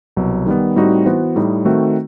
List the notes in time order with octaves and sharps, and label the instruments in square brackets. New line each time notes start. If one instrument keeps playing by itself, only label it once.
[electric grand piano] C2 B2 F#3
D#3 G3 B3
A2 G3 C4 D#4 F#4
E3 B3 F#4 C5
A2 G3 D#4
D#3 A3 C4 F#4